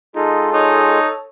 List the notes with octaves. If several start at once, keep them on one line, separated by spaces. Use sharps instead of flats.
G#3 D#4 F4 G#4 A4
D#4 C#5